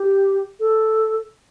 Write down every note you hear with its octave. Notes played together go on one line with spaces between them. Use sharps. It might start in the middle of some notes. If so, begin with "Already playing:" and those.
Already playing: G4
A4